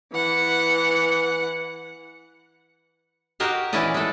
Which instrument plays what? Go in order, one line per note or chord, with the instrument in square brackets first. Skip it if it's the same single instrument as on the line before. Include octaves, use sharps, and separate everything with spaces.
[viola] E3 F#5
[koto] F#4 G4 A#4 D#5 F5
A#2 E3 C#4 E4 D5 D#5
G#3 A4